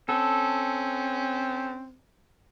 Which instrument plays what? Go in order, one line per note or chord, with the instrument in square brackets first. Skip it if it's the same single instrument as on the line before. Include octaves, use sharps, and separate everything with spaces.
[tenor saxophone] C4 [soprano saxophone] C#4 [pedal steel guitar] A4